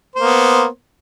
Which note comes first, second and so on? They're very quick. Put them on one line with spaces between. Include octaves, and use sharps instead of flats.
C5 A#3 B3